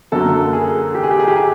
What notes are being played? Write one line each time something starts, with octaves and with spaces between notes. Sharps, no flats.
F#2 D3 F#3 A#3 A4
G#4
G4
G#4
G4
G#4
G4
G#4